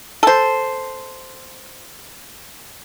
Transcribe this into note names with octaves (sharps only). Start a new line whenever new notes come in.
A4 C5